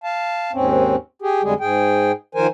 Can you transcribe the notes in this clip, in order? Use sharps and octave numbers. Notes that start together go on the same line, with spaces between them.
F5 A5
D#2 G#2 C4 C#4
G4 G#4
F2 D3 G3 G#3 G#4
G#2 G#4 G5
D#3 F3 A#4 C5 G#5